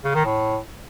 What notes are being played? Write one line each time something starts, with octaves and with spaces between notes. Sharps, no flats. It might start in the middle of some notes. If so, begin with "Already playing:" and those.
C#3
D#3
A2